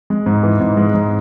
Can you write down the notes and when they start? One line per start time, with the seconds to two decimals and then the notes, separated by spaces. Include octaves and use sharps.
0.10 G#3
0.26 G#2
0.43 E3
0.60 G#2
0.77 G#3
0.94 G#2